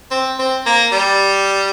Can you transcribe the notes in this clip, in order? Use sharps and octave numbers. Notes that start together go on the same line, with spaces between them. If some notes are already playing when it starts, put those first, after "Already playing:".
C4
C4
A#3
G3